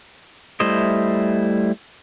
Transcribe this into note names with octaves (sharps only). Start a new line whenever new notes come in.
G3 A3 E4 C5 D#5